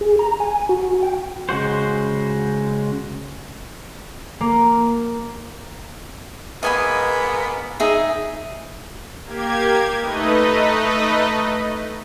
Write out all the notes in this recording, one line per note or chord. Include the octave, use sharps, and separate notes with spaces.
G#4
A#5
G#5
F#4
G5
C#3 G#3 F#4 C5
A#3
G#2 A#3 B3 D#5 G#5 B5
D#4 G#4 E5
A#3 G4 G#6
A3 D#4 B4 D#5